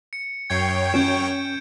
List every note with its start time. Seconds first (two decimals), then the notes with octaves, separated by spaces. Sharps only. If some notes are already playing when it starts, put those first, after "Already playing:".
0.13 C#7
0.50 F#2 C#5 G5 G#6 C7
0.94 C#4 G6 D7 E7